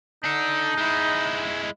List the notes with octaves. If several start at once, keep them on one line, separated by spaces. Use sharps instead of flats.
D4 D#4 A4
G#3 E4